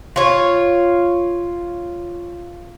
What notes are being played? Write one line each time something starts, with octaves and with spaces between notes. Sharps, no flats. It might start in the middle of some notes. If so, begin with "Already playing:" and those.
F4 C#5